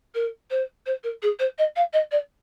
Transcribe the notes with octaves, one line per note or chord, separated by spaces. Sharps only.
A#4
C5
C5
A#4
G#4
C5
D#5
F5
D#5
D5